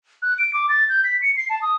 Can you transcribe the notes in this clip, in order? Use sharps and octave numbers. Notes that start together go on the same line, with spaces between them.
F#6
D7
D6
A6
G6
B6
C#7
C7
A5
D#6